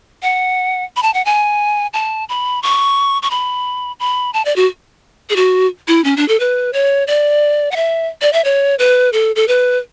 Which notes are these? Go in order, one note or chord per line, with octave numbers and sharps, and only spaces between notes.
F#5
B5
A5
F#5
G#5
A5
B5
C#6
C#6
B5
B5
A5
D5
F#4
G#4
F#4
E4
C#4
D4
A4
B4
C#5
D5
F#5
E5
D5
E5
C#5
B4
A4
A4
B4